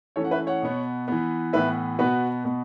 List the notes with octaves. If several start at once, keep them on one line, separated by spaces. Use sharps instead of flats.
E3 A3 C#4 A4 C#5
F#5
B4 E5
C#5 F#5
B2 B3
E3 B3
A2 E3 B3 B4 E5
B2 B3 F#4 B4
B2 B3